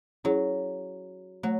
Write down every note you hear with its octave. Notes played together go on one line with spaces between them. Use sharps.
F#3 C#4 E4 G#4 C#5
F#3 A3